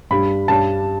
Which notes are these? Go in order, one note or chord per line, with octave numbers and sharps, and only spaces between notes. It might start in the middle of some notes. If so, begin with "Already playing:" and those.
G2 G3 D4 B5
G2 G3 D4 A5